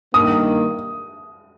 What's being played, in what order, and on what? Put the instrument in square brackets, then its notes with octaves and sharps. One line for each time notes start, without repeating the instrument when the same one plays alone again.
[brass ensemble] G2 D#3 A#3 [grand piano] D#6